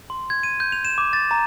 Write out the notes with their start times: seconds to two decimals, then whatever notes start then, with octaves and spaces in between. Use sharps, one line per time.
0.10 C6
0.30 G#6
0.43 D#7
0.60 G6
0.72 F7
0.85 E7
0.98 D6
1.13 A6
1.31 A#5